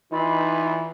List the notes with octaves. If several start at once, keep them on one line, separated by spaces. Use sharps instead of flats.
E3 D#4 F4 B5